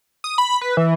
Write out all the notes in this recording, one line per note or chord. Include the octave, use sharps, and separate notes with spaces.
D#6
B5
B4
E3